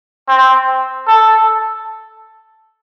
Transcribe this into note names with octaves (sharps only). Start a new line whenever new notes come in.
C4
A4